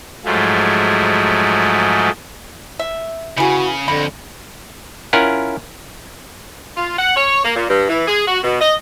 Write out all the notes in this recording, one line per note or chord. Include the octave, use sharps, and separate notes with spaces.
G#2 F3 F#3 G#3 A3
E5
C#3 E3 F#4 G#4
F2 D3 B5
C#4 E4 F4 A#4 F#5
F4
F#5
C#5
A#3
A#2
G2
E3
G#4
F#4
B2
D#5